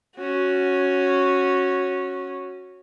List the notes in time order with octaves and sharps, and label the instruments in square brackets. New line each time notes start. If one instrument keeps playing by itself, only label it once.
[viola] C#4 F#4